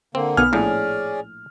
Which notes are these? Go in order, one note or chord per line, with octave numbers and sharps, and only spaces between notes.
D3 A#3 C4
B1 B3 G#5 F6
A#1 A2 C#4 G#4 D5